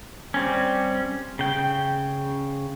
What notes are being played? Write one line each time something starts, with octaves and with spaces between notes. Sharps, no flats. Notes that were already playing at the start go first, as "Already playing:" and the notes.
G3 C4 C#4
C#3 G5